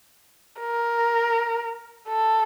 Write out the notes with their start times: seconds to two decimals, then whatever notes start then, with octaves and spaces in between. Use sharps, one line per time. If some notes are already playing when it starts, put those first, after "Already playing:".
0.61 A#4
2.08 A4